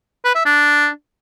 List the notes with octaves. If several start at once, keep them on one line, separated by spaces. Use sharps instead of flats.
B4
E5
D4